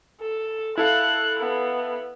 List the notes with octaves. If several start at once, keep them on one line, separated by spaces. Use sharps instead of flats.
A4
E4 A4 F5 F#6
B3